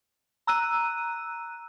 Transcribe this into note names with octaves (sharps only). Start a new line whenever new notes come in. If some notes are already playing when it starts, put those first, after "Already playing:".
A#5 E6 F#6 D#7